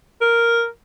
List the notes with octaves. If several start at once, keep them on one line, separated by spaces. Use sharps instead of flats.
A#4